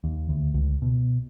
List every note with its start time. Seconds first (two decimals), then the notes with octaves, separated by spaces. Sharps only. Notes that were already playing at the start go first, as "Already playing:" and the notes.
0.04 D#2
0.29 D2
0.54 C#2
0.82 B2